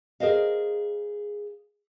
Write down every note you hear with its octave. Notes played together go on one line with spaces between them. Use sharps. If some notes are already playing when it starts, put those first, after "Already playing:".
G#4 A#4 C5 D#5 F5